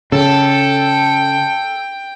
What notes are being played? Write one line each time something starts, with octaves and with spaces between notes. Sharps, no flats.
C#3 A4 G5